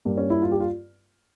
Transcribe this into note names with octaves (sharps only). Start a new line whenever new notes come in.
G2 G3 A#3
C#4
E4
F4
G4
F4